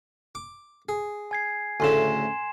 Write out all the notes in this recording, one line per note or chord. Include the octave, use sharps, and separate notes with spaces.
D6
G#4
G#5 G#6 C7
D2 A2 C#3 G#5 C6 E7